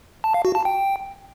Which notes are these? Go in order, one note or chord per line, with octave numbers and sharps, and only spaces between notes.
A5
F5
F#4
A5
G5